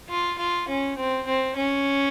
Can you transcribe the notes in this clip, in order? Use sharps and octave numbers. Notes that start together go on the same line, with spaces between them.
F4
F4
C#4
C4
C4
C#4